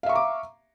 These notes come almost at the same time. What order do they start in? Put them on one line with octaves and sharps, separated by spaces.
F5 E5 C#6 A#5 D6